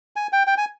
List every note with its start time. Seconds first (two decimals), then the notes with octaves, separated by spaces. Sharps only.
0.16 G#5
0.33 G5
0.47 G5
0.58 G#5